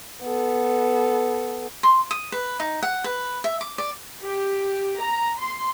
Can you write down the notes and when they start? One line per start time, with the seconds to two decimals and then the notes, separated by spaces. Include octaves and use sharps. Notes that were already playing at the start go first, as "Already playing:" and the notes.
0.22 B3 A4
1.83 C6
2.11 D#6
2.32 B4
2.60 D#4
2.83 F#5
3.04 B4
3.44 E5
3.61 D6
3.78 D5
4.23 G4
4.99 A#5
5.39 C6